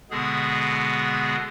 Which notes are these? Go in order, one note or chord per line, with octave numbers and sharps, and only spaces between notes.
B2 D3 G#3 B3 G#4